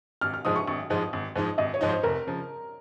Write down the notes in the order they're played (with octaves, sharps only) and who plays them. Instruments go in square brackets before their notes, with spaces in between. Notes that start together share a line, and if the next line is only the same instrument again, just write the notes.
[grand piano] G#1 [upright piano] F6
[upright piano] F6
[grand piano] G#2 F3 G#3 D#4 [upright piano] D#6
[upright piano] C#6
[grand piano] G#1 [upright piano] C#6
[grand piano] G#2 F3 G#3 D#4
G#1
G#2 F3 G#3 D#4
[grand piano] G#1 [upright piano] D#5
[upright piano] C#5
[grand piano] G#2 F3 G#3 D#4
[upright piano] C5
[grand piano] F1 [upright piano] A#4
[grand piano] C#3 F3